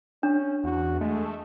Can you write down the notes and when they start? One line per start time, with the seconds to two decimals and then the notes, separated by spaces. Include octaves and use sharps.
0.23 C#4 D4
0.64 E2 F#4
1.01 G#3 A3